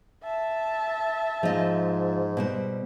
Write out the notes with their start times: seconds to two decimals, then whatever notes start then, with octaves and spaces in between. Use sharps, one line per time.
0.24 E5 A5
1.43 G#2 F3 D#5
2.37 B2 G3 C5